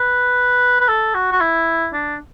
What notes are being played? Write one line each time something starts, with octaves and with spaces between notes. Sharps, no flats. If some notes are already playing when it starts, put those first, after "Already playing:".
Already playing: B4
B4
A4
F#4
F#4
E4
D4